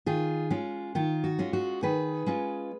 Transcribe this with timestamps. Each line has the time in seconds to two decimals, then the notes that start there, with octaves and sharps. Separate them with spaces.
0.06 D#3 F4 G#4
0.50 G#3 C#4 F4
0.95 D#3 F4
1.24 F#4
1.39 G#3 C#4 F4
1.53 F#4
1.83 D#3 G#4 B4
2.26 G#3 C#4 F4